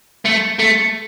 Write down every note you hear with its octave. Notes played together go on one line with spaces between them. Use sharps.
A3
A3